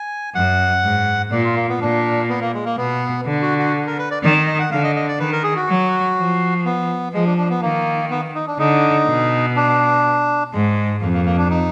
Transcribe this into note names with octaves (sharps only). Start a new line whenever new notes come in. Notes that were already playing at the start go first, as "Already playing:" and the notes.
Already playing: G#5
F#2 F#5
G#2
A#2 D5
F4
A#3
B3
A#2 D4
B3
A#3
G#3
A#3
B2 B3
D3
F#4
F#4
A#4
B4
D5
D#3 D5
D#5
F#5
D3 F5
D#5
D#5
D5
D#3 B4
A#4
G#4
F#4
F#3
F3
B3
F3 G#3
D4
D4
B3
D#3 A#3
B3
D#4
D4
D3 D#4
B2
D4
G#2 G#3
F2 A#3
A#3
A#3
D4
D#4